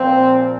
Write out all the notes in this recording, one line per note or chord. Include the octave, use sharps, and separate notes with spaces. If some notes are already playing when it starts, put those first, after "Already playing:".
Already playing: A#2 F3 C4